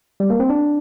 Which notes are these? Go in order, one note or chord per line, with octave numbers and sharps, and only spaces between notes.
G3
A#3
C4
D4